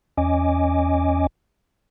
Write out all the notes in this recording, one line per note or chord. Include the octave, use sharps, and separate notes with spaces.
E2 C#4 D#5 G#5 D6